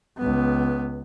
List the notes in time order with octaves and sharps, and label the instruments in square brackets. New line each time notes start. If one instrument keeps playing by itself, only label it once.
[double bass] C#2 B3